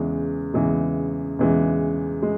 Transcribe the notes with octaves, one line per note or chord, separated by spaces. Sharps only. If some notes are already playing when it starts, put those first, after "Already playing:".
Already playing: E2 C#3 E3 G#3
E2 C#3 E3 G#3
E2 C#3 E3 G#3
G#3